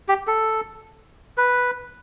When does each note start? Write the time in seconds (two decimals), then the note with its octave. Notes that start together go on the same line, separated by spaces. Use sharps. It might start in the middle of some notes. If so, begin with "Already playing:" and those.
0.09 G4
0.27 A4
1.37 B4